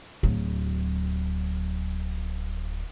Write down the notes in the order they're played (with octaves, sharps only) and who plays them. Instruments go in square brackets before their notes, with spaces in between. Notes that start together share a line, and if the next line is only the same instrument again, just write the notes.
[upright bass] D1 F#3